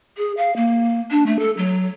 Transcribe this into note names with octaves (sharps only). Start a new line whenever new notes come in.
G#4
F5
A#3
D4
A3
A4
F#3